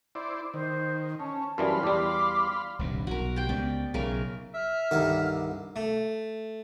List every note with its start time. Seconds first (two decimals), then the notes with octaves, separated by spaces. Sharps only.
0.15 E4 C5 D5
0.54 D#3 C5
1.20 C#4 A5
1.58 F#2 E3 G3 F5 B5 C6
1.83 E2 G3 D6
2.79 D#1 C2 G2
3.07 B1 F#4 A#4
3.36 G4 C5 G5
3.49 C#2 B3 D5
3.94 B1 C#3 A#4 E5
4.54 E5 F6
4.91 C2 G2 D3 D#3 A#4
5.76 A3